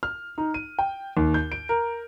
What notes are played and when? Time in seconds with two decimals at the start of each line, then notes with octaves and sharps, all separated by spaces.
0.03 F6
0.38 D#4
0.54 D#7
0.79 G5
1.17 D#2
1.34 G6
1.52 D7
1.69 A#4